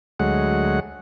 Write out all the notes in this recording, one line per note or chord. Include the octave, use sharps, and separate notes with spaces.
D2 F#3 G#3 F#5